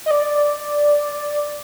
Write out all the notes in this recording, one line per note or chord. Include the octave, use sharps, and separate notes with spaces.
D#5
D5